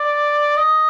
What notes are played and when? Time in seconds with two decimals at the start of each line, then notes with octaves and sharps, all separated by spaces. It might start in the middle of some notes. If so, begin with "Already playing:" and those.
Already playing: D5
0.57 D#5